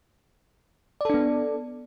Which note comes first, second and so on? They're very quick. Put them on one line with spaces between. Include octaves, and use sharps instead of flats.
D5 A4 D4 B3